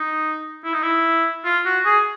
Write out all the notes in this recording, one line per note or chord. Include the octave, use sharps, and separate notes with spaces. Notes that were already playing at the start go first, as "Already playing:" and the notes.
Already playing: D#4
E4
D#4
E4
F4
F#4
G#4